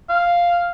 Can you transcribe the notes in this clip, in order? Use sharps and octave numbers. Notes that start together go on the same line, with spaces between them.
F5